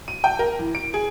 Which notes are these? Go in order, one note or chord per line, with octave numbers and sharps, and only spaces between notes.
D#7
G5
A#4
E3
D7
G#4